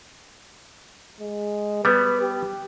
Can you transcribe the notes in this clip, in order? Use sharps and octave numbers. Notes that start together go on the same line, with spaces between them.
G#3
G3 B3 B4
G4